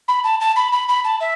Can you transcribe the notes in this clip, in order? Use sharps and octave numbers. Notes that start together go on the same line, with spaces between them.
B5
A5
A5
B5
B5
B5
A5
E5